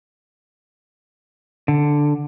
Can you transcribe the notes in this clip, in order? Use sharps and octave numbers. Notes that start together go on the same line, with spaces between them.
D3